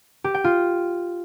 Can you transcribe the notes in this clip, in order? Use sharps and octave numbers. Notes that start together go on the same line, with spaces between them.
G4
G5
F4